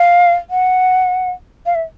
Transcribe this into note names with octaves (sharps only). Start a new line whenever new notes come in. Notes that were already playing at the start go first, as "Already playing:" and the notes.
Already playing: F5
F#5
F5
E5